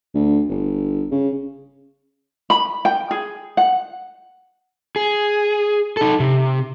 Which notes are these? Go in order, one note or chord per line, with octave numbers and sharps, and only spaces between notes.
D2
G1
C#3
B5
G5
G#4
F#5
G#4
D#4 A4
C3